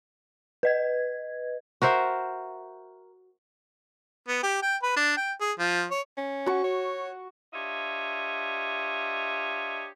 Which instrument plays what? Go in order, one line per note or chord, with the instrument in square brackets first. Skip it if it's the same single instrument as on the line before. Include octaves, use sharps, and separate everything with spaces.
[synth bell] B4 D#5 G#6
[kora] F#4 A#4 C5 E5
[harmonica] B3
G4
G5
B4
D4
G5
G#4
F3
C#5
[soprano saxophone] C#4
[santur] F#4 C#6
[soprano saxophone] C#5
[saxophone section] D4 F4 G4 C#5 D#5 E5